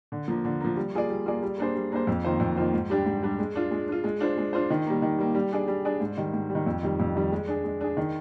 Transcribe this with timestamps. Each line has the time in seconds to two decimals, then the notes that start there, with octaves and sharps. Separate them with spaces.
0.12 D3
0.28 F3 A#3
0.45 D3
0.60 F3 A#3
0.76 G3
0.94 A#3 F4 G#4 D5
1.10 G3
1.26 A#3 F4 G#4 D5
1.43 G3
1.58 A#3 D4 G#4 C5
1.76 G3
1.92 A#3 D4 G#4 C5
2.07 F2
2.25 D#3 A#3 F4 C5
2.40 F2
2.57 D#3 A#3 F4 C5
2.74 G#2
2.90 G3 D4 G4
3.06 G#2
3.23 G3 D4 G4
3.39 G#3
3.55 D4 F4
3.71 G#3
3.88 D4 F4
4.04 G#3
4.21 D4 F4 C5
4.37 G#3
4.53 D4 F4 C5
4.70 D#3
4.87 G3 A#3
5.02 D#3
5.18 G3 A#3
5.35 G3
5.52 D4 G#4 D5
5.68 G3
5.85 D4 G#4 D5
6.00 G#2
6.17 D#3 G3
6.33 G#2
6.50 G3
6.55 D#3
6.66 F2
6.83 D#3 G3
7.00 F2
7.15 D#3 G3
7.32 G#3
7.48 D4 G#4
7.64 G#3
7.81 D4 G#4
7.97 D#3